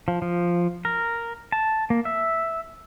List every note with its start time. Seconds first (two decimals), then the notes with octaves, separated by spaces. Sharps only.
0.08 F3
0.22 F3
0.85 A#4
1.52 A5
1.90 A#3
2.05 E5